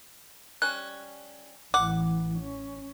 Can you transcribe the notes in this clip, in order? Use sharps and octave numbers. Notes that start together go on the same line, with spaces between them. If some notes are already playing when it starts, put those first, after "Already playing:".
G3 C#4 F#6
A1 E3 F#5 D6
C#4